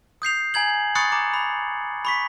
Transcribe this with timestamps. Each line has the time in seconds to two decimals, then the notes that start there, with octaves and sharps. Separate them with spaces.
0.22 D#6 G6 C7 F7
0.54 G#5 A#5 G#6 F#7
0.95 B5 C#6 D#6 F#6 A6 C#7
1.12 A#5 D6
1.34 B5
2.05 B5 C#6 B6